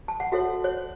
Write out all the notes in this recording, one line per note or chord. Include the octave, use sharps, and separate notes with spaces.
A5
F#5
F#4 A4 C#5 E5
C#5